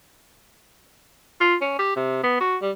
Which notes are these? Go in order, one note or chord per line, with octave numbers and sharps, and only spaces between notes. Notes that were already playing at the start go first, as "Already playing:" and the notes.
F4
C#4
G4
C3
B3
F#4
G3